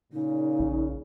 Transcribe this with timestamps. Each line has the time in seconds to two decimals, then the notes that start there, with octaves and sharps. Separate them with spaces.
0.13 A#2 C#3 D#4
0.60 A#1